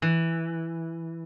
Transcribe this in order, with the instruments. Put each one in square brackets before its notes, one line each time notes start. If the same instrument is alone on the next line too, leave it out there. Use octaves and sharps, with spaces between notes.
[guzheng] E3